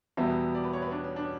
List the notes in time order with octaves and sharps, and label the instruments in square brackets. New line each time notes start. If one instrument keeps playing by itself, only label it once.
[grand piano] E2 B2 G3 B3 [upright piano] E5
[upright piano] D5
B4
C#5
B4
D4
C#4
D4
C#4